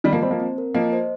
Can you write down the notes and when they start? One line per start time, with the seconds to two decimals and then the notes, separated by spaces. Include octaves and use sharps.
0.04 D#3 G3 D#5
0.13 F3 A#3
0.22 G3 C4 C5
0.31 F3 A#3
0.40 C4
0.58 A#4
0.75 F3 A#3 D#5
0.93 C5